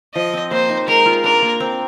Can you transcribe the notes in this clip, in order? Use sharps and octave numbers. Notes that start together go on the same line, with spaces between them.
F3 D#5
C4
A#3 C5
D#4
G#3 A#4
F4
D4 A#4
A#3
C4